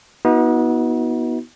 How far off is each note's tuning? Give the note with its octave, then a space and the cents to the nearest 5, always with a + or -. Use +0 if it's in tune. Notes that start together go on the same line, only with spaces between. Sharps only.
B3 -20 D#4 +45 F#4 +0